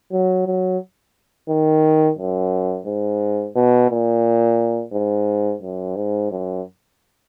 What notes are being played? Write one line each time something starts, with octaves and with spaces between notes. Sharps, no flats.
F#3
F#3
D#3
F#2
G#2
B2
A#2
G#2
F#2
G#2
F#2